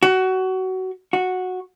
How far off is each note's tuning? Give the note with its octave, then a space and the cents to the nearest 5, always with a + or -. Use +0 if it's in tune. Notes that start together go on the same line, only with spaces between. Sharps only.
F#4 +20
F#4 -10